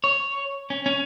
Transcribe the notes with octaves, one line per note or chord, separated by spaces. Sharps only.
C#5
C#4
C#4